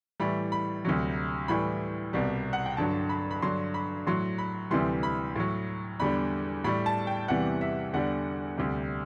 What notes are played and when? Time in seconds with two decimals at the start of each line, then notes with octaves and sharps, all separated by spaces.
0.20 A2 E3 G3 B5
0.52 B5
0.85 D2 C3 F#3
1.48 A2 E3 G3 B5
2.13 C2 B2 G3
2.53 F#5
2.66 G5
2.77 G2 D3 F#3 A5
3.09 B5
3.31 B5
3.42 G2 D3 F#3 C6
3.74 B5
4.07 A2 F#3 C6
4.38 B5
4.71 D2 C3 E3 G3 C6
5.03 B5
5.36 A2 F#3
6.00 E2 D3 G3 B5
6.64 A2 G3 B5
6.86 A5
7.07 G5
7.28 E2 C3 E3 G3 F#5
7.61 E5
7.93 E2 D3 G3 F#5
8.58 D2 C3 G3